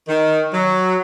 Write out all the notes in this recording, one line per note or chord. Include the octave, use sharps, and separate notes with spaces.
D#3
F#3